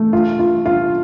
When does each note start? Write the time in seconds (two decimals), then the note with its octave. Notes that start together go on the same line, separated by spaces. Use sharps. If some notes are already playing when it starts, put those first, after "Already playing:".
Already playing: A3
0.13 F4
0.39 F4
0.66 F4